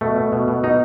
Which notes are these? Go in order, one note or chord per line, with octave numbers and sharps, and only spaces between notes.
B2 A3
B2
B2
B2
B2 D#4